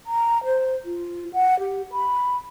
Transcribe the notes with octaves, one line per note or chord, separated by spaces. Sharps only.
A#5
C5
F4
F#5
G4
B5